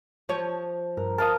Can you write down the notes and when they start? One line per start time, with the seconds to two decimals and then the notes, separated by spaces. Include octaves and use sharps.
0.29 F3 C#5
0.97 G2 A#4
1.18 A#4 F5 A5 A#5 D#6